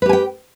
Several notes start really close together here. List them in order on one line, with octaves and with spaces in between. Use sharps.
B4 G4 G#5 G5